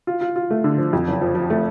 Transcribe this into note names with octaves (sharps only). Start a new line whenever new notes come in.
F4
F4
F4
A3
D3
F3
F2
F#1
F3
F3
A3